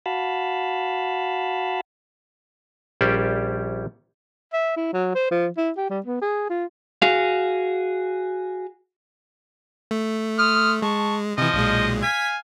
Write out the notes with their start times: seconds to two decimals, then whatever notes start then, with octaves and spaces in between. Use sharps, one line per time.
0.06 F#4 F5 A5 B5
3.01 A#1 G3 C#4 G4 C5 D5
4.53 E5
4.77 E4
4.93 F#3
5.15 C5
5.31 F3
5.57 E4
5.77 G4
5.90 G3
6.06 B3
6.21 G#4
6.50 F4
7.02 F#4 G#4 F5
9.91 A3
10.39 C6 D#6 F6
10.82 G#3 A5 C#6
11.38 C3 E3 F3 D#5
11.54 B1 A#2 G#3
12.02 F5 G#5 G#6 B6